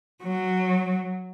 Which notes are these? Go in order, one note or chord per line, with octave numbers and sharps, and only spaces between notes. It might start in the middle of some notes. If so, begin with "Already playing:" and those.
F#3